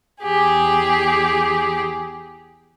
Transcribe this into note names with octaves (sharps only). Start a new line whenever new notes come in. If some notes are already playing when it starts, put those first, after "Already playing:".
E2 G4 G#4